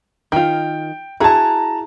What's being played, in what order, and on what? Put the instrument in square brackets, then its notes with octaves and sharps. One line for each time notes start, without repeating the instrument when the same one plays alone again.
[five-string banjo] D#3 F4 [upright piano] G5
[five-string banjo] E4 F#4 G#4 [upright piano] A5 A#5